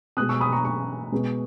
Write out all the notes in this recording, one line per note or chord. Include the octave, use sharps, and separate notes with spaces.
B2 G#3 B3 D#6 F#6
C#6 E6
B5 D#6
A#5 C#6
A#5 C#6
B2 G#3 B3